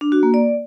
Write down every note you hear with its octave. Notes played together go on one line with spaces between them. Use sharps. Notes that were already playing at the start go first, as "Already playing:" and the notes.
D4
F#4
A#3
D5